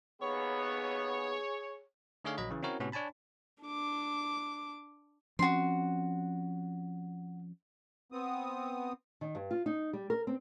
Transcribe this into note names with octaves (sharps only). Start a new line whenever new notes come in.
D#2 B3 G#4 C#5
D3 A3 D#4 G#4 C#5 F5
A#1 F#3 D#5 B5
C#3 E3
C4 C#4 E4 F#4 A#4 C#5
A2 C3 B3 C#4 F#4
D4 C#5 G#5 A5 B5
D4 D6
F3 C4 C#4 F#4 C6
B3 C4 D#6
D#3
G2
F4
D#4
G3
A#4
C4